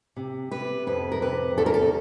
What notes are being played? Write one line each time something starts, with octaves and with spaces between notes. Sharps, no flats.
C3
C3 B4
F2 B4
A#4
C3 B4
E2 A4
A#4
A4